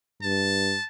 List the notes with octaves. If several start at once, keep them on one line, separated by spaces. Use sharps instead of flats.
G2 A5